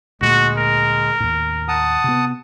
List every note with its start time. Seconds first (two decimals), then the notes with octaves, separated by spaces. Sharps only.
0.21 D2 A#2 G#3 A3 F#4
0.57 A#4
1.20 D#2 A2
1.68 F#5 A5 D#6
2.04 C3 B3